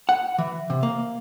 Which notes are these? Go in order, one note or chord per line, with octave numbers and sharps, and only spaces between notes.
F#5
E3
C3
A#3